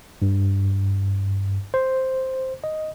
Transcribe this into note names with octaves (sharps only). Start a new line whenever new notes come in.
G2
C5
D#5